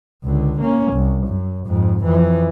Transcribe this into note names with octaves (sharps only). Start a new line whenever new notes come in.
C#2 D3
A#3 C#4
C2
F#2
F2 G#2
F2 E3